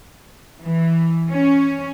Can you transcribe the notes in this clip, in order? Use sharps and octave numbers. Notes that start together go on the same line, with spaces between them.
E3
C#4